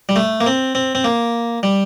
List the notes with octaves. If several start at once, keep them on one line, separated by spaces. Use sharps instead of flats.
G3
A3
A#3
C4
C4
C4
A#3
G3